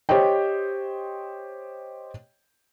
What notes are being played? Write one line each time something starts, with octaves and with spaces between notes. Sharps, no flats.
G4 C5 C#5 D#5 G5